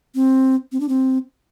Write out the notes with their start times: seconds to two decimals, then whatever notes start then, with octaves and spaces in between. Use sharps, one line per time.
0.15 C4
0.72 C4
0.80 D4
0.89 C4